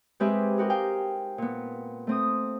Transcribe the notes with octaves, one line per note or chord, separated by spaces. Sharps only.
G#3 C4 G4 B4 E5 G#5
D#4 F#4 G4 A#4
F5 G5 G#5
A#2 B3
A3 C4 D#6